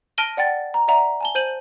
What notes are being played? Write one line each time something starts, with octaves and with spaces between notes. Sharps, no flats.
A5 F6 A#6 D7 D#7 G7
D5 F#5 G5 A6
A#5
D5 E5 F#5 A#5
G#5 A5 G7
C5 G6 D#7 F#7